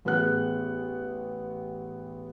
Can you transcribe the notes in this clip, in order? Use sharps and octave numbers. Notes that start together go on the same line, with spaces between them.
A1 B3 G#4 F#5 F#6